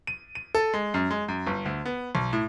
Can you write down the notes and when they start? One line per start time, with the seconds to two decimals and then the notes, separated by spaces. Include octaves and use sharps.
0.07 D#7
0.35 D#7
0.55 A4
0.74 G#3
0.94 F#2
1.11 G#3
1.28 F#2
1.47 G1
1.65 D2
1.85 B3
2.15 B1
2.33 A2